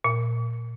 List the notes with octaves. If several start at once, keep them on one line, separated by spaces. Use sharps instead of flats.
A#2